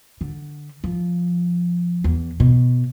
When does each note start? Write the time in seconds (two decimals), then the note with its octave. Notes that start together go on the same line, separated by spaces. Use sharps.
0.21 D3
0.84 F3
2.04 E2
2.40 B2